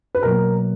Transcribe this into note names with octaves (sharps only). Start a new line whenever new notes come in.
B4
B2 F#3 A#3 A#4